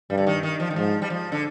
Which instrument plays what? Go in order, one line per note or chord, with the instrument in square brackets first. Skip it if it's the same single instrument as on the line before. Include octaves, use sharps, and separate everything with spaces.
[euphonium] G2 [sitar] G3
[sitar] D3
D#3
D#3
F3
D#3
[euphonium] G#2 [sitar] F3
[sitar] G3
F3
D3